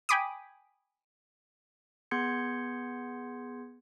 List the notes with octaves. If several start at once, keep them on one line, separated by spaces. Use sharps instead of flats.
G5 G#5 B5 D6 D#6
B3 G#4 C6 G6 G#6 C#7